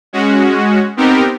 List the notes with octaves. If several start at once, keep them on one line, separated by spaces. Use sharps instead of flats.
G#3 C#4 F#4
B3 C4 D#4 G4 A#4